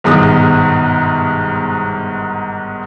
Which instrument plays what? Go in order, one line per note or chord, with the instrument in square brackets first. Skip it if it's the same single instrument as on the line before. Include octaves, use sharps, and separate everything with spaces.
[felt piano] G1 G#2 B2 D#3 G#3 D#6